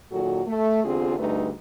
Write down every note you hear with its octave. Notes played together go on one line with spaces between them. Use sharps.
A#2 D#3 F#3 F#4 G#4 A4
A3
E2 D3 C4 F4 G4 G#4
D2 G2 A3 D#4 G#4 B4